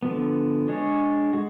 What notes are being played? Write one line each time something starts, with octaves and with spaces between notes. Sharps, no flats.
D3 F3 B3
G#3 D4 G#4 C#5
G#3 F#4